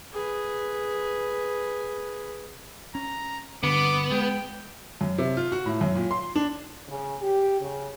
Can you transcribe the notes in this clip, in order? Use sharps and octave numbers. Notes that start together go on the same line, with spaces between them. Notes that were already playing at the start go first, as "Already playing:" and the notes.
G#4 B4
C#4 A#5
G2 D3 B3 D6
G#3 G5
F#2
C3
F4
F#4
A2
F#2
A#2
C6
D4
C#3
G4
C#3